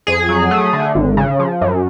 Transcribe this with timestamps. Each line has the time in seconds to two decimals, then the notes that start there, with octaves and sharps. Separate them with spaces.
0.07 F2 G#4
0.29 F#3
0.51 A3
0.73 D3
0.95 G#1
1.17 C#3
1.39 F3
1.61 F#2